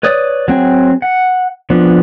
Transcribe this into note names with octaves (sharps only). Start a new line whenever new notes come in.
B4 C#5 D5 D#6
F#3 C4 G#4
F#5
F3 B3 D4